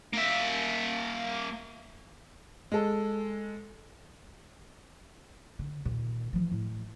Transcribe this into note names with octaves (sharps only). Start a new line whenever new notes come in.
A#3 E5
G#3 A4
D3
D#2 A#2
E3 F3
A2